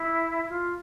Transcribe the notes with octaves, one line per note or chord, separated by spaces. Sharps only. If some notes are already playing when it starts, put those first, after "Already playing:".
Already playing: E4
F4